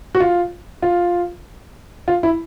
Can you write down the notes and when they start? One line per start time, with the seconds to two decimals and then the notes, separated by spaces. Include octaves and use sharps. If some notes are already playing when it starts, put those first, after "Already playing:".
0.15 F#4
0.20 F4
0.82 F4
2.08 F4
2.23 E4